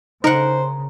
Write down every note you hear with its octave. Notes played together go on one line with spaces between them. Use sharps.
C#3 D#4 A#4 C5 F#5